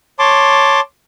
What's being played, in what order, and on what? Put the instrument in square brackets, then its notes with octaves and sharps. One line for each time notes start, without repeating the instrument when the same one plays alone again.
[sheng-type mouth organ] C#5 A5 C6 D6